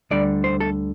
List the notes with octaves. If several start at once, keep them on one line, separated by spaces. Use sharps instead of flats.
D2 D3 G3 D5
C5
A4